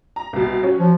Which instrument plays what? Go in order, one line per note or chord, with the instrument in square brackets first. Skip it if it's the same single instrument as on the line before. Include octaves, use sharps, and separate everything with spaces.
[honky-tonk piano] A#5
C2 B2
F#3 C#4
[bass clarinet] F3